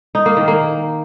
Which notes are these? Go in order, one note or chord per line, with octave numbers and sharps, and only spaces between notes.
D#4
A#3
D#3
A#3